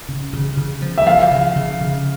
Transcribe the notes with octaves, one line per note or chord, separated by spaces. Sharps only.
C#3
C#3
C#3
F3
E5
F3 F5
C#3
C#3
C#3